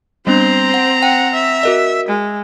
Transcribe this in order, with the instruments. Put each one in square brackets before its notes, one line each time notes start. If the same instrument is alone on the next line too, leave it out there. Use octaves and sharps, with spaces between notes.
[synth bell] G3 B3 D4 [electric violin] C4 A#5 [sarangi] C5
[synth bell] F#5
[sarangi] F#5 [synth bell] G5
[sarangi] E5
[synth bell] F#4 A#4 D#5
[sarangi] G#3